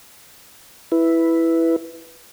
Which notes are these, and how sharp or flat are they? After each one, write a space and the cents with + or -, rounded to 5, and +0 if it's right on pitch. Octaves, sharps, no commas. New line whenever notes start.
E4 +0 B4 +0